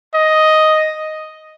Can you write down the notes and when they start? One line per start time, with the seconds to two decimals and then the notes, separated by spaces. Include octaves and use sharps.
0.14 D#5